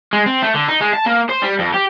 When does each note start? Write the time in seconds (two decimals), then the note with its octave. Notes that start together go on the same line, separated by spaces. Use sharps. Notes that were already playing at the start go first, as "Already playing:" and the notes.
0.13 G#3
0.26 C4
0.42 A3
0.55 D3
0.69 D#4
0.81 G#3
0.94 A5
1.06 A#3
1.29 C5
1.42 G3
1.59 F2
1.74 G4